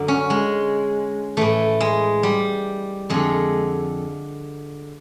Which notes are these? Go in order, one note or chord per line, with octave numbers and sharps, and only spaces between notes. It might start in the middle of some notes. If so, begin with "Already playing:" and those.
Already playing: F#2 D3
C#4
G#3
A2 E3 A3
G#3
G3
F2 D3 G#3